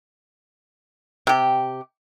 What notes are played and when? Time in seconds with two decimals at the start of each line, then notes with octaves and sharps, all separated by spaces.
1.27 C3 G4